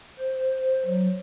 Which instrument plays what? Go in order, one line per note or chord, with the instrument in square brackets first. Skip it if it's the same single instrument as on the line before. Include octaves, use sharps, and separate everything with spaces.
[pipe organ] C5
F#3